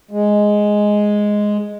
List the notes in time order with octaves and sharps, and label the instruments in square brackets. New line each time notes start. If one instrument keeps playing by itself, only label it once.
[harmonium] G#3